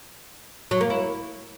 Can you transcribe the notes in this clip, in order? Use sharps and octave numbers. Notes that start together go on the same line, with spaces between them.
F#3
A#3
E4